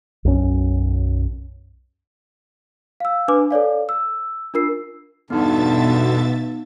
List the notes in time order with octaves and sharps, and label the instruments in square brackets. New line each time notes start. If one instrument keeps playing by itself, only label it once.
[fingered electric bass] B1 F#2 C#4
[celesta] F5 E6
D4 B4 G#5 D6
A4 C#5 D5 F5
E6
D4 F4 A#4 E6 C7
[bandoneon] E2 G2 D3 [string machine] B2 E5 A6 [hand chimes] B3 D#4